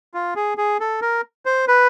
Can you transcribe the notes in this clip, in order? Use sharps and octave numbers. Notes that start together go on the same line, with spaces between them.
F4
G#4
G#4
A4
A#4
C5
B4